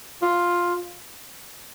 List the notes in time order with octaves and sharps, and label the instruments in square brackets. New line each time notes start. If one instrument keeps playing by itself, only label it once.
[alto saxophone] F4